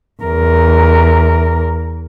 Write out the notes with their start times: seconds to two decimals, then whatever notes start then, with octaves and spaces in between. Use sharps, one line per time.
0.23 E2 A#4